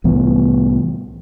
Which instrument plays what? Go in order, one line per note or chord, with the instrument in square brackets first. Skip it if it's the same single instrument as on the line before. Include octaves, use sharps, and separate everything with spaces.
[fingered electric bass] C2 A2 E3 B3